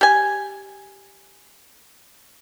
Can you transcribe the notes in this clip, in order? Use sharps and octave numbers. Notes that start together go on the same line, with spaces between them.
G4 G#5